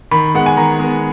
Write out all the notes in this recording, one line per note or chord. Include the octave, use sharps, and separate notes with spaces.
D#3 B5
G#3 B3 F#5
G#5
D#3 A#5
G#3 B3